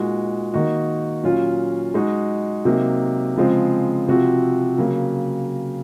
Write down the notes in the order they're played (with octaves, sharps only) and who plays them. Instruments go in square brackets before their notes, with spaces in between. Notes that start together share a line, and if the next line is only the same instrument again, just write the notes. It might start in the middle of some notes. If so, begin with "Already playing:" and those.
Already playing: [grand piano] A#2 G#3 D#4 F#4
D#3 A#3 D#4 F#4
A#2 F#3 C#4 F4
G#3 D#4 F#4
C3 F#3 A#3 D#4
C#3 F3 G#3 C4
C3 F3 C4 F#4
C#3 F#3 A#3